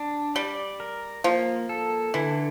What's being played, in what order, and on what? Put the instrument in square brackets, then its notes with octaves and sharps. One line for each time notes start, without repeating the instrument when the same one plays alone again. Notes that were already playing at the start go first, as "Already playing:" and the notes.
Already playing: [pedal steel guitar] D4
[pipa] G3 [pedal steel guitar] D5
[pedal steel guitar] A#4
[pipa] F3 [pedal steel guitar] A#3
[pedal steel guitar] A4
[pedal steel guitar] D3 [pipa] E3